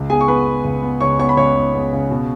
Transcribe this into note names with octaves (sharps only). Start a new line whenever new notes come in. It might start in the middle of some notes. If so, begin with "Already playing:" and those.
Already playing: C#2
B3 G#4 G#5
C#6
B3 B4 B5
B3
C#2
B3
C#2 C#5 C#6
B3 C#5 C#6
B5
C#2 C#5 C#6
B3
B3
C#3
B2